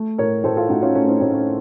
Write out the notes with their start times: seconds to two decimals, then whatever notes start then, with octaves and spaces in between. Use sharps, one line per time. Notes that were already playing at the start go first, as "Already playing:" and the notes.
Already playing: A3
0.18 A2 A#4 C#5
0.44 A2 A4 C5
0.57 F4 A4
0.69 A2 D#4 F#4
0.82 C#4 F4
0.95 A3 C#4
1.08 C4 D#4
1.20 A2 C#4
1.33 C#4